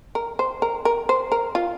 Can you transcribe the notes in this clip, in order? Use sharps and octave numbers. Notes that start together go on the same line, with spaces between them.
A#4
C5
A#4
A#4
C5
A#4
F4